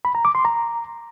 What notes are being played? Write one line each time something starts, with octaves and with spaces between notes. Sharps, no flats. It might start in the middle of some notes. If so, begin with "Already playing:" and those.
B5
A#5
D6
C6
A#5